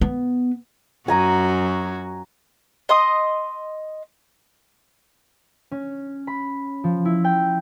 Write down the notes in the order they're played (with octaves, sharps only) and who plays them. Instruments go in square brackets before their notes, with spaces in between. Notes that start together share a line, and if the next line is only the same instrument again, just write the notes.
[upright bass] B3
[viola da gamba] F#2 F#4 [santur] G#5 A#5 D#6
[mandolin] D#5 C6 D#6
[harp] C#4
B5
F3
E4
G5